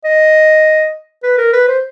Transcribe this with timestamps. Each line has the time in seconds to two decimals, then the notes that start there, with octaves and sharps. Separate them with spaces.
0.04 D#5
1.23 B4
1.38 A#4
1.53 B4
1.68 C5